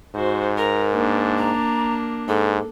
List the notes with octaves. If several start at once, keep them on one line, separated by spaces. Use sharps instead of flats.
G#2 F#4 C5
A#4 A#5
A#3 D4
A#5
G#2 A4